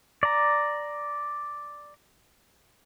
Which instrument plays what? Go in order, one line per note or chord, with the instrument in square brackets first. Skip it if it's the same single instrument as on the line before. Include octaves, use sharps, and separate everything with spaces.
[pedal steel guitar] D5 A#5